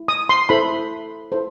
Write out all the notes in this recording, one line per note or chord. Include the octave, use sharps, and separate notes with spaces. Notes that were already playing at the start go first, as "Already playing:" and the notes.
Already playing: E4
D#6
C6
E4 A4 C5 B5
E4 A4 C5